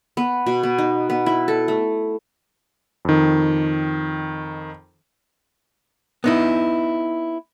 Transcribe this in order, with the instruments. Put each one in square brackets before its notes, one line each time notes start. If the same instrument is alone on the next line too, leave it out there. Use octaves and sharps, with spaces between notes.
[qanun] B3
B2
B3
D#4
B3
E4
A4
A3
[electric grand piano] F2 D#3
[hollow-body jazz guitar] B3 D#4 E4